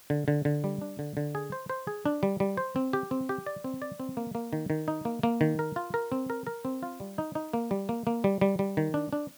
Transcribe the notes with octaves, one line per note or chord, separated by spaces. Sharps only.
D3
D3
D3
G3
D4
D3
D3
G#4
C5
C5
G#4
D4
G3
G3
C5
C4
G4
C4
G4
D5
C4
D5
C4
A#3
A#3
D#3
D#3
D#4
A#3
A#3
D#3
A#4
F4
A#4
C4
A#4
A#4
C4
F4
G3
D#4
D#4
A#3
G3
A#3
A#3
G3
G3
G3
D#3
D4
D4